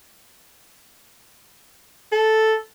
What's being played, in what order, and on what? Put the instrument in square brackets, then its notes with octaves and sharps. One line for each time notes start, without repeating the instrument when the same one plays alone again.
[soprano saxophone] A4